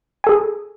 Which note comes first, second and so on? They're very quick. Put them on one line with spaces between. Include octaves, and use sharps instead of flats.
G#5 A4 G#4